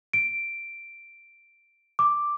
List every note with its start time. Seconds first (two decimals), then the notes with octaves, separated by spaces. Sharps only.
0.13 D7
1.99 D6